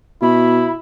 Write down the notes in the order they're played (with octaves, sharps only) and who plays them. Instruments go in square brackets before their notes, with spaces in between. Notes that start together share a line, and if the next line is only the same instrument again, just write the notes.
[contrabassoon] B2 [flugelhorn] E4 [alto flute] B5